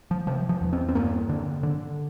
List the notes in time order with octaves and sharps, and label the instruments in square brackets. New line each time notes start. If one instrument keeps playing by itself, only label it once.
[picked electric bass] F3
C3 F3
F3
E2
C4
C4
G2 A#3
D3
D3